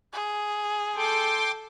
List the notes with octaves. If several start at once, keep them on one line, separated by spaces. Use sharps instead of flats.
G#4
A4 G5 C6 D6